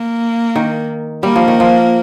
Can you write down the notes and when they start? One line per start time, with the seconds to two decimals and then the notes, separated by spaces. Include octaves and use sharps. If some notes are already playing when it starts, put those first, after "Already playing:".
Already playing: A#3
0.56 D#3
1.23 G3 A#3
1.36 F3
1.48 D#3
1.60 F3